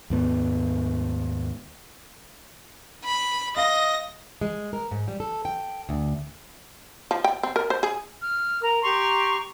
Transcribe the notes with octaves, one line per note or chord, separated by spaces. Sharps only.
D#2 G#2 B3
B5
D#5 F5 A#6
G#3
A#4
G#2
G3
A4
G5
D2
F3
G5
C4
A#4
C5
G#4
F6
A#4 A#5
G4 A#5 C6 C#6